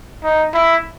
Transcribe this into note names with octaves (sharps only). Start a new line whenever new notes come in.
D#4
E4